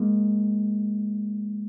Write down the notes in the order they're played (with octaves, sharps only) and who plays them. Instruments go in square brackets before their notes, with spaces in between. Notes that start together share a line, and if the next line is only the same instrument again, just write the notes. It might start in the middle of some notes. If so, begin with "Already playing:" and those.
Already playing: [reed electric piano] G#3 A#3